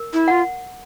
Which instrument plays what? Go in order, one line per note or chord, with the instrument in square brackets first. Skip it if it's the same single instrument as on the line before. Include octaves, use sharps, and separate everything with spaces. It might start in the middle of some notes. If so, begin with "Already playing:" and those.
Already playing: [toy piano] A#4
[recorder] E4
[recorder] F4 [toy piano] F#5